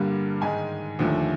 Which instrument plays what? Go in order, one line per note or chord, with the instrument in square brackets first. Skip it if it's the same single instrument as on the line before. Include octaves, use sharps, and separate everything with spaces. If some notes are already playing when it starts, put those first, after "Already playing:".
Already playing: [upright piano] G2 D3 G3 A#3
G#2 D#3 G#3 G#5
D#2 D3 F3 A3